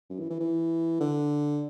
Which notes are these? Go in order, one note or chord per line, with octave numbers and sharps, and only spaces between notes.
F#2
E3
E3
E3
D3